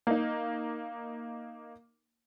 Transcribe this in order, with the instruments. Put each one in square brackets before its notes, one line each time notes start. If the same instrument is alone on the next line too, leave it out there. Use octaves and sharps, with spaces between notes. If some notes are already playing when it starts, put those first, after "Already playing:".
[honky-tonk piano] A#3 D#4